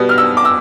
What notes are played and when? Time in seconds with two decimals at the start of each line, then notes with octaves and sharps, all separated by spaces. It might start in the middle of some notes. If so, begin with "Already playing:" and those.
Already playing: B2 G3 B3
0.09 F6
0.18 E6
0.37 D6
0.45 E6